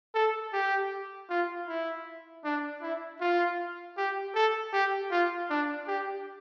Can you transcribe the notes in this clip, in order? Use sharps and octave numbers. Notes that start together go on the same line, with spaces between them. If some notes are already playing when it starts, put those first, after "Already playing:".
A4
G4
F4
E4
D4
E4
F4
G4
A4
G4
F4
D4
G4